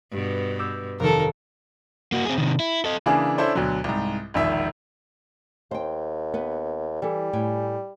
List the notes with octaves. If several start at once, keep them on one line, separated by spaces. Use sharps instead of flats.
G2 B2
D6 E6 G6
F1 D#3 A4 A#4
A#3 F#4
C4 G#4
C3 D#3
E4
A4 D#5
C#3 E3 A#3 D4 E4 G#4
C#4 D4 E4 A4 C5 D5
D2 B2 D3 F#3
C2 G#2
E1 A#1 D#3 E5
D#2 C5 G5
B3 B4
E3 G3 A4
A2 G5 G#5